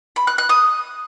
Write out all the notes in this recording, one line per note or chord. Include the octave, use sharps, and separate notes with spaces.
B5
F#6
F#6
D#6